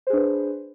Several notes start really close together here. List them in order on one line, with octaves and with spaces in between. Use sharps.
C5 G#4 D4 B4